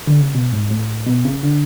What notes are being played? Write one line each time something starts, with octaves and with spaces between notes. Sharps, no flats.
D3
C#3
B2
G#2
A2
B2
C#3
D3